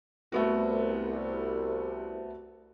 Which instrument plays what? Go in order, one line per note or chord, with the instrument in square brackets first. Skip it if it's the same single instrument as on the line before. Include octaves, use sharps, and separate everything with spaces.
[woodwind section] C2 [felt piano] A3 B3 F#4